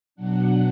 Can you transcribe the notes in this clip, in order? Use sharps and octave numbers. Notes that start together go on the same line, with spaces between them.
B2 F#3 D4 F#5